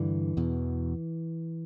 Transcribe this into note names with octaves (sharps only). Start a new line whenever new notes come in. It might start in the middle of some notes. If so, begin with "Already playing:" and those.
Already playing: G2 D3 E3
E2 B2